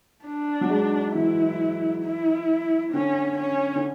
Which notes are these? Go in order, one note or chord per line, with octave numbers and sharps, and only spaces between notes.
D4
F#3
G#3
E3 E4
E4
D3 C#4
C#4
D3